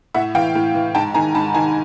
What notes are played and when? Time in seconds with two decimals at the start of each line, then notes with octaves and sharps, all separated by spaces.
0.14 A2 E5 F#5
0.34 E3 F5 G5
0.55 A2
0.75 E3
0.95 G#2 G5 A5
1.14 D#3 G#5 A#5
1.34 G#2 A5 B5
1.54 D#3 G#5 A#5